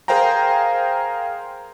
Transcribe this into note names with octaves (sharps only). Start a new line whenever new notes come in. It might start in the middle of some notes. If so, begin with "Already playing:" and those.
G#4 A#4 C5 F5 G5 A#5